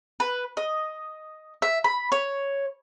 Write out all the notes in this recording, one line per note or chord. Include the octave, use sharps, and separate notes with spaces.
B4
D#5
E5
B5
C#5